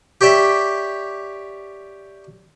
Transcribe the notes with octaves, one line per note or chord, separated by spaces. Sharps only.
G4 C#5 D5 E5 G5